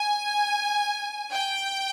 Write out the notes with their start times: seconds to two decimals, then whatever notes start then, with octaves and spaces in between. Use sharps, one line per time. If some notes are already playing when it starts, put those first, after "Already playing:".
Already playing: G#5
1.33 G5